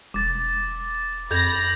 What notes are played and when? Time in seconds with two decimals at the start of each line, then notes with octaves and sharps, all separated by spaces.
0.14 E1 D6 A6
1.31 F2 B5 G6 G#6 A#6 F7